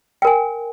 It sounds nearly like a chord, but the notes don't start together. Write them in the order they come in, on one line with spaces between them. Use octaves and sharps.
G5 A#4 G#5